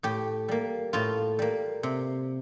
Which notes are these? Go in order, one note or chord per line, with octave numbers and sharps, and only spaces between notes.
A2 G4
G3 A#3
A2 F4
G3 A#3
C3